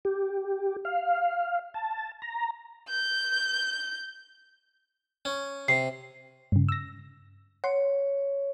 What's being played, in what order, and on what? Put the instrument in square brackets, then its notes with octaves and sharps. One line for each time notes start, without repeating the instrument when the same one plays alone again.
[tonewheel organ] G4
F5
A5
A#5
[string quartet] G6
[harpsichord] C#4
[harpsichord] C3 [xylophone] C7
[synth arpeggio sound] G2 C#3
E6 A#6
[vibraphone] C#5 [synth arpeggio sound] F#5 C6